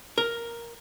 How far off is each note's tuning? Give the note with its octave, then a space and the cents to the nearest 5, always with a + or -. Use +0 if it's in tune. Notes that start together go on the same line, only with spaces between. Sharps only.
A#4 +5